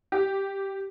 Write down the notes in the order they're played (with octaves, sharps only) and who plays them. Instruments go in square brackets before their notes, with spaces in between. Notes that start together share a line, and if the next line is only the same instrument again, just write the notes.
[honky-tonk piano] G4